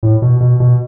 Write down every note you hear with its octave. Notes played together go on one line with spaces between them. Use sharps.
A2
B2
B2
B2